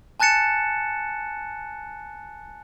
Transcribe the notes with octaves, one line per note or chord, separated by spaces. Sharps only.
G#5 A5 F#6 A6 C#7 E7